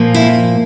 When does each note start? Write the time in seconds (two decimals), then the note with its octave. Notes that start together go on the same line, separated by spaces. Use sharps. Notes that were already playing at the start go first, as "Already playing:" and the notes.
Already playing: A#2 F3 A#3
0.14 E4